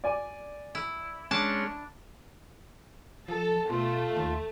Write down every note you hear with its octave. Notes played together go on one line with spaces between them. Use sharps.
D5 G#5
E4
G#3 C#4 D4 A5
F3 A4
B2 A3 F4
D#2